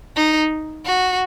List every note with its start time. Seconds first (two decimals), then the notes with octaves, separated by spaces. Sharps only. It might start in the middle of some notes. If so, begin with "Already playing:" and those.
0.16 D#4
0.85 F#4